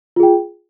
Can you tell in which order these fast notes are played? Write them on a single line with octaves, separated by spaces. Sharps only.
F4 G#4 G5